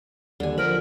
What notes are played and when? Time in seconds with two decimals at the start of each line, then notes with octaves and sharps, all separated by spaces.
0.40 D#2 D3 G3 G#5
0.58 F3 A#4 B5